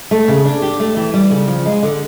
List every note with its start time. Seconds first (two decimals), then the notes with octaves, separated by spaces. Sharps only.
0.11 A3
0.28 C#3
0.45 D4
0.62 G4
0.80 A3
0.97 E3
1.14 G3
1.31 C#3
1.48 F3
1.65 G#3
1.82 D3